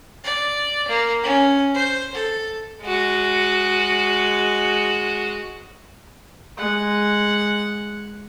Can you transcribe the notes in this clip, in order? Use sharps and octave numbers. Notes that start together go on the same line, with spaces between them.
D5
A#3
C#4
C5
A4
G#3 F#4
G#3 F#5